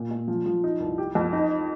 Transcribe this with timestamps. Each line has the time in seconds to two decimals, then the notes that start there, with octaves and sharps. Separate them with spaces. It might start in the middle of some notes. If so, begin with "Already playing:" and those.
Already playing: A#2
0.11 A#2
0.28 F3
0.46 F3
0.64 D#4
0.80 C2
0.98 G4
1.15 F2
1.33 D#4